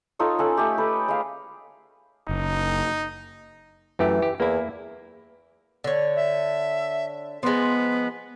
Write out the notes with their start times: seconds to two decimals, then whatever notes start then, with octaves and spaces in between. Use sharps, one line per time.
0.19 D#4 F4 A4 C#5
0.39 C#4 A4 F#5
0.57 A3 G4
0.78 A4 B4
1.08 G#3 F5
2.29 F#1 D#4
3.99 F#2 E3 A3 G4
4.22 G4
4.40 E2 A#3 E4
5.84 D3 C#5
6.16 E5
7.43 F3 G#3 B3